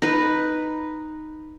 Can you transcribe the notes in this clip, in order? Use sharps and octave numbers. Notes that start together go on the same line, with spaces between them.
D#4 B4